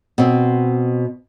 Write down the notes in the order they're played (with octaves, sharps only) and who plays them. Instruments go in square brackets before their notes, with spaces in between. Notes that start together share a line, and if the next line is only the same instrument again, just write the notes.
[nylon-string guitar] B2 C4